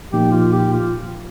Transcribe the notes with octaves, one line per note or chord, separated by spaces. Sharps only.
A#2 F3 A#3 D#4 G4
F4
G4
F4